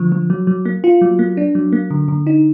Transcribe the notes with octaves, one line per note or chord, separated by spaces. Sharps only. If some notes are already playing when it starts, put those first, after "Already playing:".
Already playing: D3 F3
F3
F#3
F#3
A#3
F4
F#3
A#3
D4
F#3
A#3
D3
D3
D#4